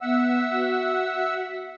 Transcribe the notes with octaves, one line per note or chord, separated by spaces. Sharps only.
B3 E5 F#5 E6
F#4